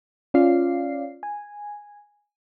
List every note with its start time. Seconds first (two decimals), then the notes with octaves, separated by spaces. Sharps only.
0.34 C#4 F4 D5 F5 C7
1.23 G#5